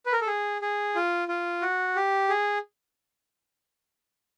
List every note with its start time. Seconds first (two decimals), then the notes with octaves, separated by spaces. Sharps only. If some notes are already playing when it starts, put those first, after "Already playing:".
0.06 B4
0.13 A#4
0.21 A4
0.27 G#4
0.62 G#4
0.95 F4
1.28 F4
1.62 F#4
1.96 G4
2.29 G#4